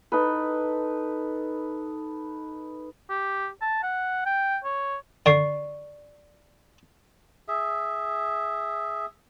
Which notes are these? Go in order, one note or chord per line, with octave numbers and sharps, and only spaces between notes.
D#4 A4 B4
G4
A5
F#5
G5
C#5
D3 D5 C#6 C7
G#4 E5